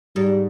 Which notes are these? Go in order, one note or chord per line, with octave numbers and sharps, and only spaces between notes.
G#2 G3